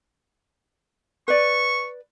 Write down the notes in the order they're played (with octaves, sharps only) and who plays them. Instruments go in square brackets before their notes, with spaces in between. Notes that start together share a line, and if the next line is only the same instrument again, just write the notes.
[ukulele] B4 D5 [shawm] C#6